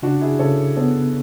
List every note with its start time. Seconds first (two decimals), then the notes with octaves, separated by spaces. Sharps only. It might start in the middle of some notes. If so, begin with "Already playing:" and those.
0.03 C#3 D4 F#4
0.21 E4 G#4
0.39 C#3 A4 C#5
0.77 B3 A4 C#5